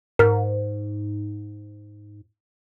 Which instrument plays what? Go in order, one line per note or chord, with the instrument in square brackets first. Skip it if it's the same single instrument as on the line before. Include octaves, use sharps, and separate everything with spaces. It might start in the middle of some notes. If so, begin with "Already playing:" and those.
[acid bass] G#2 [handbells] A#4 F6